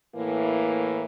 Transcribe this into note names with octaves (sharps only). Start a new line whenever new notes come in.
A2 E3 A#3